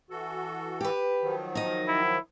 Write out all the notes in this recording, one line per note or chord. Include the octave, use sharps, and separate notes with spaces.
E3 F#4 A4
G4 B4
D#3 F3 F#3
D#4 D#5
E4